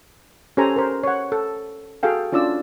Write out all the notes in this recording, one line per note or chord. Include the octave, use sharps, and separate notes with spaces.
C#4 G4 A4 C5 G#5 A#5
A#4 C5
C#5 F#5
A4
F#4 G#4 A4 F5 G5
C#4 D4 F4 D5 E6